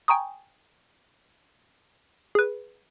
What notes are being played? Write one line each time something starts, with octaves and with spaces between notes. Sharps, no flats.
G5 G#5 A#5 C#6 D#6
G#4 B4